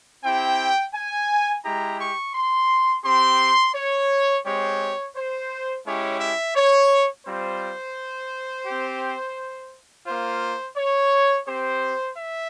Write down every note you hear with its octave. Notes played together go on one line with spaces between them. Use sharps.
C4 E4 G4 G5
G#5
G#3 E4 G4 A#5
C#6
C6
C4 G4 C6
C#5
G#3 C4 G4 C#5
C5
G#3 C#4 E4 G4 C#5
E5
C#5
G3 C4 F4 C5
C4 G4
A#3 F4 C5
C#5
C4 G4 C5
E5